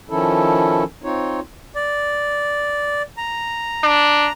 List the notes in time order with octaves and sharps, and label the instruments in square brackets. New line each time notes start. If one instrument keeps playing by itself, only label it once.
[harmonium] D#3 F3 C#4 E4 A4
C4 D#4 F4 C#5
[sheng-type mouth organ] D5
A#5
[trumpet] D4